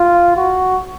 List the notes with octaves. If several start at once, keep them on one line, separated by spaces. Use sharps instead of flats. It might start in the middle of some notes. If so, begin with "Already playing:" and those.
Already playing: F4
F#4